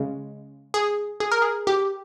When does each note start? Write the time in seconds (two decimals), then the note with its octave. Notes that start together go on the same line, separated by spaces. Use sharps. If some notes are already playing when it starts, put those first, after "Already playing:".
Already playing: C#3 G#3
0.74 G#4
1.20 G#4
1.32 A#4
1.42 G#4
1.67 G4